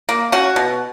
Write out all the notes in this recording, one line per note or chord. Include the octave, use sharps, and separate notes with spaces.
A#3
C#4 F#4
B2